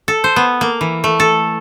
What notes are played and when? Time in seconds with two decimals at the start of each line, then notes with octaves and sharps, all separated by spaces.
0.08 A4
0.24 C5
0.36 B3
0.61 A#3
0.81 E3
1.04 A3
1.20 A4